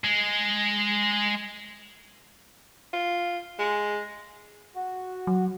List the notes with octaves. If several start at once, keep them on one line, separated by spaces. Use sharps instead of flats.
G#3
F4
G#3
F#4
F#3